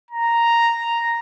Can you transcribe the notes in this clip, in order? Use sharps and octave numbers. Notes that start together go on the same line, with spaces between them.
A#5